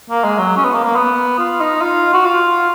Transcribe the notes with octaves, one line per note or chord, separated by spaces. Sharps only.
A#3
G#3
F#3
C#4
B3
A#3
A#3
B3
F4
D#4
F4
F#4
F4